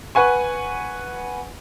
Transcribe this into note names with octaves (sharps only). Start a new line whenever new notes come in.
B4 F#5 G#5 C#6